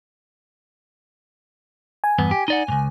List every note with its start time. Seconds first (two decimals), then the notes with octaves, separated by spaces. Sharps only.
2.04 G#5
2.19 E2 G2 B3
2.31 G4
2.48 D#4 D5 F#5
2.68 C#2 G#2